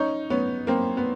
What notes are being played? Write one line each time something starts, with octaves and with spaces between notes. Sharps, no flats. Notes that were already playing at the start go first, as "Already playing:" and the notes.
Already playing: C#4 D#4
B3 C#4
A#3 C4
B3